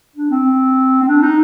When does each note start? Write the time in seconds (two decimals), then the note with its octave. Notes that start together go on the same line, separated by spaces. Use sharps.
0.16 D4
0.30 C4
1.03 C4
1.08 D4
1.22 D#4